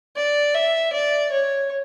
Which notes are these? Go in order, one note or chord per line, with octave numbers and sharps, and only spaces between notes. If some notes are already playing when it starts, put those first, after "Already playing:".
D5
E5
D5
C#5